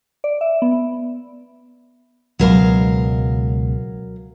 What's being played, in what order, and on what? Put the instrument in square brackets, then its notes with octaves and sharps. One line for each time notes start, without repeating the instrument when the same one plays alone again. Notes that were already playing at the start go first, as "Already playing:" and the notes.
[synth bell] D5
E5
B3
[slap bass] C#2 B2 G#3 [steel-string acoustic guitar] F#3 A#4 F5